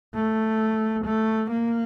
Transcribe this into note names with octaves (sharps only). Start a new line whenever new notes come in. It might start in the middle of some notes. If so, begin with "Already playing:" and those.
A3
A3
A#3